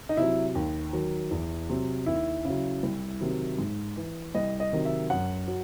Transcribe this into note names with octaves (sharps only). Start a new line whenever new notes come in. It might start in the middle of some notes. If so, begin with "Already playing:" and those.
D#4
C3 F#3 E4
D#2
D#3 F#3
E2
C3 F#3
D#2 E4
C#3 F#3
C2
C3 D#3 F#3
G#2
E3
C2 D#5
D#5
C3 D#3 F#3
E5
F#2 F#5
F#3